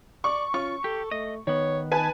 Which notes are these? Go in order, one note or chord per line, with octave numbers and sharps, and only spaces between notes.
D5 C#6
C#4 F4 C#6
G4 A4
A3 D#5
D#3 B3 C#5
D#4 B4 G#5 A5